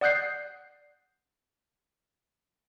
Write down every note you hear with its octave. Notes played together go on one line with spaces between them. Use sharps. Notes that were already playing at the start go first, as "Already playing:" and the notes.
D5 F#5 D#6 F#6 G6 C7